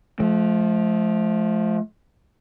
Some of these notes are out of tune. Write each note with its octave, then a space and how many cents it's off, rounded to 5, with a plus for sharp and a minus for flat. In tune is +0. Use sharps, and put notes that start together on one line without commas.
F3 +0 A3 -40